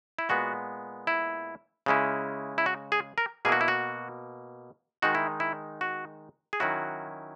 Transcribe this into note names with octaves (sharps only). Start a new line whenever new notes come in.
E4
A#2 G#3 B3 F#4
E4
C#3 G#3 C#4 E4
E4
F#4
G#4
A#4
B2 A#3 E4 G#4
F#4
E4
F#4
D#3 G#3 D#4 F#4
E4
E4
F#4
G#4
D#3 F#3 C#4 E4 F#4